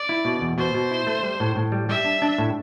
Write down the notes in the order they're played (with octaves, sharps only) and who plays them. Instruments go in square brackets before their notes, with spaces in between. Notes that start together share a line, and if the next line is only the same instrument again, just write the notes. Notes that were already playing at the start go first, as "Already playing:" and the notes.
Already playing: [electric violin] D5
[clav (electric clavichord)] E4
B2
E2
[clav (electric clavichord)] B2 [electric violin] C5
[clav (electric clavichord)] B2
E4
A3
G3
A2
A2
G3
[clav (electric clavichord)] G3 [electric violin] E5
[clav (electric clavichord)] D4
D4
A2